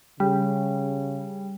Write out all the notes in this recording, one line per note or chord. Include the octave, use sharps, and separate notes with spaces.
C#3 G3